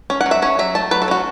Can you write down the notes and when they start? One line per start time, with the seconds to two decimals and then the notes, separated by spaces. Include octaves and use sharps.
0.10 C#4
0.21 F#5
0.26 F#3
0.31 E5
0.42 C#4 C#5
0.59 F#3 E5
0.75 A3 A5
0.91 F#3 B4
1.02 A4
1.08 C#4 F#4